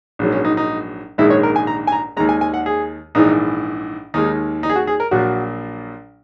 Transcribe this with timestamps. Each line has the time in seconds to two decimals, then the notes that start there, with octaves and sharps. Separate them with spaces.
0.19 A#1 G#2 F#3
0.32 C#4
0.45 D#4
0.57 D#4
1.18 A#1 G#2 D#3 G#3 E4
1.30 C#5
1.43 A#4
1.56 G#5
1.67 A#5
1.87 G#5
1.92 A#5
2.17 D#2 D#3 G#3 A#5
2.29 G#5
2.41 G#5
2.54 F#5
2.66 G#4
3.15 A#1 G#2 E3 D#4
4.14 D#2 D#3 G#3 D#4
4.63 D#4
4.70 G#4
4.76 F#4
4.87 G#4
5.00 A#4
5.11 A#1 A#2 F#3 F#4